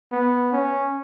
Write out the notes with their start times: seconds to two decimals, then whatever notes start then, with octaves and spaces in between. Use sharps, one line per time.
0.12 B3
0.53 C#4